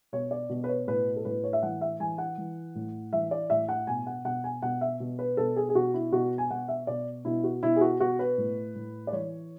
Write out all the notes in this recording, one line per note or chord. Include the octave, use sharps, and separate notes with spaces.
B2 C#5
D5
B2
B4
C#5
A2 B4
A4
A2 B4
C#5
E5
E3 F#5
E5
E3 G#5
F#5
E3
A2
E3 E5
D5
A2 E5
F#5
B2 G#5
F#5
B2 F#5
G#5
B2 F#5
E5
B2
B4
B2 A4
G#4
G#4
B2 F#4
E4
B2 F#4
G#5
B2 F#5
E5
B2 D5
B2 E4
F#4
B2 E4
G#4
F#4
B2 F#4
B4
A2
A2
D5
E3 C#5